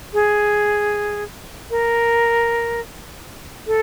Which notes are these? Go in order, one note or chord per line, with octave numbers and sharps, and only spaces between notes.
G#4
A#4
A4